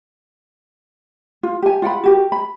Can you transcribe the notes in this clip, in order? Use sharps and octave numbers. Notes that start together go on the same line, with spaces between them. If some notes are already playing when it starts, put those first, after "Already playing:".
F4
G4 G#5
F4 F#5 G5 B5
F#4 G4 A#4
B5